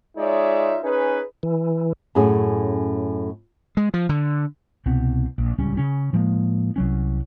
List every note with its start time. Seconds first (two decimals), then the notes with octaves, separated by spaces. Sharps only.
0.17 G#3 D#4 F4 C#5 D5 E5
0.83 C#4 D#4 G#4 B4
1.43 E3
2.15 F#2 A2 C#4 G#4
3.77 G#3
3.94 F3
4.09 D3
4.86 C2 B2 B3 C4
5.38 A#1
5.58 D1 C#2 G3 C#4
5.77 C#3 C#4
6.13 A2 F3 G#3 A#3
6.76 C2 F#3 C#4